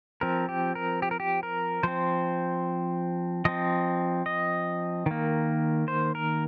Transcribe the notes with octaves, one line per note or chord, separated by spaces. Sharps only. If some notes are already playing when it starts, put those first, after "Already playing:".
F3 C4 A#4
G4
A#4
G4
A#4
G4
A#4
F3 C4 C5
F3 C4 D#5
D#5
D#3 A#3
C5
A#4